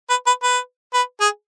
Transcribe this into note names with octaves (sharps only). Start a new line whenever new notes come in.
B4
B4
B4
B4
G#4